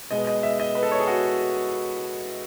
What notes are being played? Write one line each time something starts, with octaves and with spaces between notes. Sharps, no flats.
B2 G#3 B3 D#5
D#5
E5
D#5
B4
A4
C#5
G#4
F#4